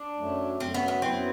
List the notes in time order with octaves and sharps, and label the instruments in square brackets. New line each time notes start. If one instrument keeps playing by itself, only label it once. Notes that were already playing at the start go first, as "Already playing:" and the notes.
Already playing: [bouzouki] D4
[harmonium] F#2 F#3 A3
[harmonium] F#2 F#3 A3 [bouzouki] C4
[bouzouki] B3
B3
[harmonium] F#2 F#3 B3 E4 B4 [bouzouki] C4